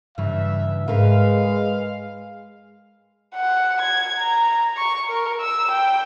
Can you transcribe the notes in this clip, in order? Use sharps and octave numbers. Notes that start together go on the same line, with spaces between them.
G2 C#3 E3 E5
G#2 G#3 A#4 B4 F5
F#5
G#6
A#5
C#6
A#4
E6
G5